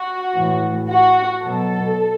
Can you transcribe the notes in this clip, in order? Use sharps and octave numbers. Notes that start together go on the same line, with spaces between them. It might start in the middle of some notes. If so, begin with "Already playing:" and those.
Already playing: F#4
A2 E3
F#4
B2 F#3 A4